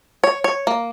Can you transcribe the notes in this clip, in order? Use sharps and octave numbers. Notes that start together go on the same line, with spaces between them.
C#5
C#5
A#3